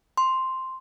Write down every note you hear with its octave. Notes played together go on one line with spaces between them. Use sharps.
C6